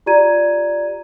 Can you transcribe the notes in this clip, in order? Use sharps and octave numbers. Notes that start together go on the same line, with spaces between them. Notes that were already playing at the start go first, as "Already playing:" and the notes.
F4 G4 D5 A#5 G#6 D#7